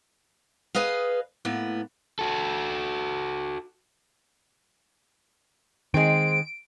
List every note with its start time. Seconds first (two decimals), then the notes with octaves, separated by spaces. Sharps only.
0.75 G#4 B4 D#5 F5
1.45 A2 A#3 B3
2.19 F#4 A4
5.94 D#3 G#3 C4 D7